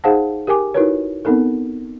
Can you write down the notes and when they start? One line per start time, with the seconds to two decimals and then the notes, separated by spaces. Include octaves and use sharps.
0.04 D#4 G#4 C5 F5 F#5 A5
0.47 G4 A#4 G5 G#5 D6
0.74 D#4 E4 F#4 A#4 B4 C#5
1.25 B3 C4 D#4 A4 A#4